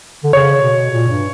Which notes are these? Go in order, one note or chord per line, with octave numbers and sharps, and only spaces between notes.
D3
C#3 C#5
B2
A#2
G2